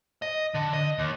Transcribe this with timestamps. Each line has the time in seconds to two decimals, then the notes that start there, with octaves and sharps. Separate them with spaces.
0.22 D#5
0.54 D3
0.73 D#5
0.98 D#2